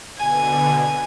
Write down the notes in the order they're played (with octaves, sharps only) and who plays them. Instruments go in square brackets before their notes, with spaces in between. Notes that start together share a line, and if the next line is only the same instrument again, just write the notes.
[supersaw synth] B2 D3 [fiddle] G#5